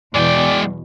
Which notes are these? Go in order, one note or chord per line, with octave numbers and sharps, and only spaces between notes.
E2 B2 G#3 D5 G5